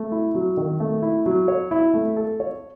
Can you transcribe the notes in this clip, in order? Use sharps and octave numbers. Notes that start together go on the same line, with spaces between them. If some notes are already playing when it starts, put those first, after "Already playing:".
Already playing: A3
E4
F#3
D#3
A3
E4
F#3
C#5
E4
A3
A4
C#5